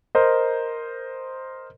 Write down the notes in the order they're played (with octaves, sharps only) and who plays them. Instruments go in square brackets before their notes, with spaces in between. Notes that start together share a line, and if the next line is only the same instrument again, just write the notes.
[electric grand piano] A#4 C5 D#5